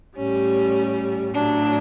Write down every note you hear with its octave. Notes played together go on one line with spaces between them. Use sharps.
A2 G3 C#4
A2 F#3 D4